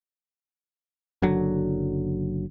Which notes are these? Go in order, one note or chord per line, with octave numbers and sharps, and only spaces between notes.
F#1 D3 F#3